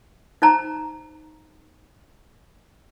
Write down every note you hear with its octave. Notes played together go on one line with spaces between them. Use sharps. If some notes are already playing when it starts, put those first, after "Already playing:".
D#4 C5 A5 A#5